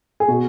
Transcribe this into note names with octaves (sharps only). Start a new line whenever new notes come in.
G#4
B2 F#4